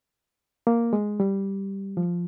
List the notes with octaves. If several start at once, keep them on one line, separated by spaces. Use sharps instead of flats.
A#3
G#3
G3
F3